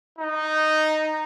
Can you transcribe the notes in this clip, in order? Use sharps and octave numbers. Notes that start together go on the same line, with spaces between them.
D#4